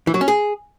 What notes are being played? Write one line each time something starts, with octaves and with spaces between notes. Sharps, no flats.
E3
F#3
C#4
G#4